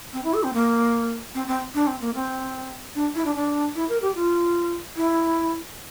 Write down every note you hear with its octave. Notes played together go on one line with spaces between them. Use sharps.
C4
E4
A4
C4
A#3
C4
C4
D4
C4
A#3
C4
D4
E4
D4
D4
E4
A#4
G4
F4
E4